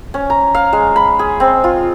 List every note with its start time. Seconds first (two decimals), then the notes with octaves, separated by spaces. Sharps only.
0.14 C#4
0.30 A#5
0.55 F5
0.73 G#3
0.96 B5
1.19 G#4
1.40 C4
1.64 F4